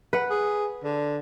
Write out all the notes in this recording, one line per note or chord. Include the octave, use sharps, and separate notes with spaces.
B4 F#5
G#4
D3